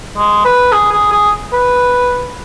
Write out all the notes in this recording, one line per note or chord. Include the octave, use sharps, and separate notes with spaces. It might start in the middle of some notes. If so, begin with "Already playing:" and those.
G#3
B4
G#4
G#4
G#4
B4